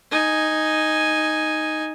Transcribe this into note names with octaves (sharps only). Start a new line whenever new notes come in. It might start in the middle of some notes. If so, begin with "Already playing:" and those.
D#4 G#5